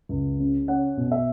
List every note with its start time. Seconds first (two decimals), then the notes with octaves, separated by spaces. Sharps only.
0.09 C#2
0.40 C#3
0.68 C#4 F#5
0.97 B2
1.12 E5